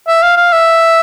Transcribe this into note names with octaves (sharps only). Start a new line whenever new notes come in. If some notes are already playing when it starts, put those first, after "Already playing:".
E5
F5
F5
E5